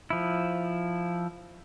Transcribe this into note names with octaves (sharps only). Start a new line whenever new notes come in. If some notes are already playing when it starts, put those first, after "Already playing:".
F3 E4